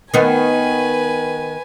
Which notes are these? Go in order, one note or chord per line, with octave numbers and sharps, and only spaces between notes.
D#3 B3 B4 G#5